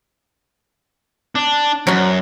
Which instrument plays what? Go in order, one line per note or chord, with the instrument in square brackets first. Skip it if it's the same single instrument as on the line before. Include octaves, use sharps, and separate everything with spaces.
[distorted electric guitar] D4
[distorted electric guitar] F#2 [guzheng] F#3 F#4